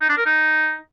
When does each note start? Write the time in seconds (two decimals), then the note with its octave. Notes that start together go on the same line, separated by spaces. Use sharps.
0.01 D#4
0.09 D4
0.18 A#4
0.26 D#4